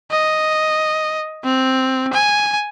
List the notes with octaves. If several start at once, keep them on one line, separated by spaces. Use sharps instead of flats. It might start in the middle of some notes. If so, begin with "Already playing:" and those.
D#5
C4
G#5